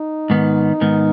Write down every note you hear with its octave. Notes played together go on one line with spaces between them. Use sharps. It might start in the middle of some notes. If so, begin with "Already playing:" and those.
Already playing: D#4
G#2 D#3 B3
G#2 D#3 B3